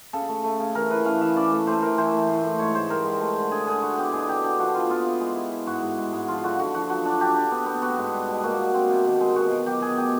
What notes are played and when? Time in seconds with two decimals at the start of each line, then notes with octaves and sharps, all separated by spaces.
0.13 C#3 A4
0.29 A3
0.44 A3
0.60 C#3
0.75 E3 A#4
0.90 E3 B4
1.05 C#4 F5
1.21 E3 E5
1.36 C#4 D5
1.52 A3
1.67 A3 C5
1.82 E3 A#4
1.98 E3 C5
2.13 A3
2.29 A2
2.44 A2
2.59 G#2 C#5
2.75 G#2 C5
2.90 G3 A#4
3.05 G#2
3.21 A3
3.36 D3
3.51 D3 G#4
3.67 D3 G#4
3.82 E4 F#4
3.98 B3 G4
4.13 B2 G#4
4.29 B3 G4
4.44 D4 G4
4.59 F3 F#4
4.74 B3 F4
4.90 B3 F4
5.05 E4
5.20 G#3
5.36 E4
5.51 E4
5.67 G#2 F#4
5.82 G#2
5.98 G#2
6.13 G#2
6.28 F3 F4
6.43 D3 F#4
6.59 D3 F#4
6.74 F3 F#4
6.90 F#3 F#4
7.05 D4
7.21 D4 G4
7.36 D4
7.51 B3
7.66 B3
7.82 B3 F#4
7.97 G#2
8.13 G3
8.29 B2
8.43 A#3 F#4
8.59 B2
8.74 C4
8.90 C3
9.05 D#3
9.20 G#3
9.36 B2 F#4
9.51 B2
9.66 F#3 G4
9.82 B2 G#4
9.97 A3 G4